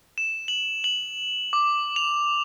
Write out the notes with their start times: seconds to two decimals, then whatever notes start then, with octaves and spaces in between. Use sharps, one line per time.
0.18 E7
0.48 F#7
0.84 F#7
1.53 D6
1.96 F7